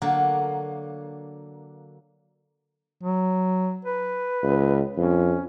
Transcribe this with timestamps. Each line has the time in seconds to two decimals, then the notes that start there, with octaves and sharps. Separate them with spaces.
0.02 D3 F#3 A#3
3.03 F#3
3.85 B4
4.43 C#2
4.97 F2 C#4